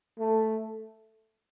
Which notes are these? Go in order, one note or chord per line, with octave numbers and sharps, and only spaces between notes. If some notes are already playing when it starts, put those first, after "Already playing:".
A3